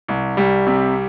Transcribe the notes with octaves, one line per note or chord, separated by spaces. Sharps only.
C2
C2 G3
C3